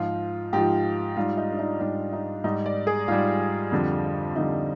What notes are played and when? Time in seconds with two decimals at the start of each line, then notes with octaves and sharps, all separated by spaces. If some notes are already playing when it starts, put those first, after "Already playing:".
Already playing: G#2 F3 F4
0.53 G#2 F3 G4
1.17 G#2 G3 F4
1.37 D#4
1.52 D4
1.59 D#4
1.80 G#2 G3 D4
2.13 D#4
2.44 G#2 G3 D#4
2.66 D5
2.87 G#4
3.08 G#2 G3 F4
3.72 F2 D3 G3
4.36 F2 D3 G3 D#4